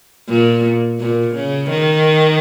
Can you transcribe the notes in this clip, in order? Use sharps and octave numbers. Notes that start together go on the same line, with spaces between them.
A#2
A#2
C#3
D#3